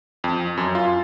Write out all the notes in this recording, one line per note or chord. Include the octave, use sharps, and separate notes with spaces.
F2
F#2
F4